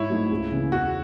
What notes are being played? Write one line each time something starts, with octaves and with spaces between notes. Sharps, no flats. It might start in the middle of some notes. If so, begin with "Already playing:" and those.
Already playing: G#2 E4 C#5
F#3 A3 D#4
C#2
C#3 E3
E1 F#4